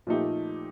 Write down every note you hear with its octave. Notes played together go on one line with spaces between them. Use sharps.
A#2 F3 A3 D#4 G4